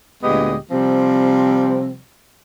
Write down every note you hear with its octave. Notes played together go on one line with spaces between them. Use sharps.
D2 A#2 G#3 B3 G4 D#5
C3 F3 G3 C4